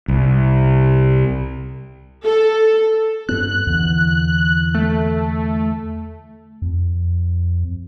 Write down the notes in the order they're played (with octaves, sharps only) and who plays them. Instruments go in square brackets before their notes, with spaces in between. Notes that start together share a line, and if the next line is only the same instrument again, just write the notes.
[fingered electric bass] C2
[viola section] A4
[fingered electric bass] G2 B3 [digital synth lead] F#6
[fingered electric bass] E2 D3 E3
[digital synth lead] A3
[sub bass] F2